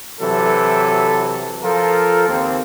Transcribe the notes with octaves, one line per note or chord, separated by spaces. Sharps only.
C3 E3 F#3 A4
F3 F4 A4 A#4
D#2 A#3 C4